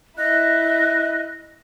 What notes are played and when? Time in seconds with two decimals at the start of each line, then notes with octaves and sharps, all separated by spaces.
0.18 E4 D#5 F#6